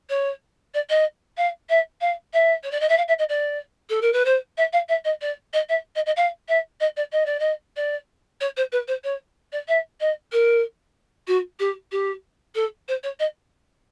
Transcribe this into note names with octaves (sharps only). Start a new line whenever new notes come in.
C#5
D5
D#5
F5
E5
F5
E5
C#5
D5
D#5
E5
F5
E5
D#5
D5
A4
A#4
B4
C5
E5
F5
E5
D#5
D5
D#5
E5
D#5
D#5
F5
E5
D#5
D5
D#5
D5
D#5
D5
C#5
C5
B4
C5
C#5
D5
E5
D#5
A#4
F#4
G4
G4
A4
C5
C#5
D#5